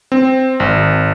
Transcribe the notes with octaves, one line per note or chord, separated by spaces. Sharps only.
C4
G#1